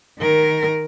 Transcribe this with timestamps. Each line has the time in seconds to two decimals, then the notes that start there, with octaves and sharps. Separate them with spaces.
0.20 D#3 A#4